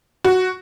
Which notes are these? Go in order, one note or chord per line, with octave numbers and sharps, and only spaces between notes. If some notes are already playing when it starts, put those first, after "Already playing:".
F#4